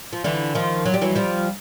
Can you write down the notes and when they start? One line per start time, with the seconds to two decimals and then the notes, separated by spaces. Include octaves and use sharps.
0.13 F3
0.24 D3 E3
0.55 D#3 F3
0.85 F#3
0.94 G3
1.01 E3 F#3
1.16 F3 G3